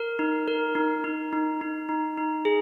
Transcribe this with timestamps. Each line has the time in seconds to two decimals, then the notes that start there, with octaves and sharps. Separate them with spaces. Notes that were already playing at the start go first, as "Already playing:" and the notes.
Already playing: A#4
0.19 D#4
0.48 A#4
0.75 D#4
1.04 D#4
1.33 D#4
1.61 D#4
1.89 D#4
2.18 D#4
2.45 G#4